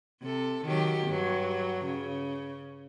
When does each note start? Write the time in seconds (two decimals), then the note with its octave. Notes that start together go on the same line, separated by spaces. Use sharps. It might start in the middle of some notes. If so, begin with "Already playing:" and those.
0.22 C3 A4
0.65 D#3 F#3 G4
1.07 G2 F#3
1.84 C#3